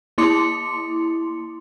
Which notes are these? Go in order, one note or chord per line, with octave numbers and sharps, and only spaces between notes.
A#3 E4 C6 D6 C#7